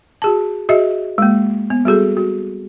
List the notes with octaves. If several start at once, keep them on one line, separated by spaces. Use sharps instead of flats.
F#4 G#4 A5
F#4 G#4 D#5 E5
G#3 A#3
B3
G3 F#4 G#4 A4
F#4